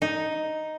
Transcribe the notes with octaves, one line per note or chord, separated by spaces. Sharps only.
D#4